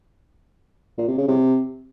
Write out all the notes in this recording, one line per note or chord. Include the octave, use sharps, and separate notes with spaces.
A#2
C3
C#3
C3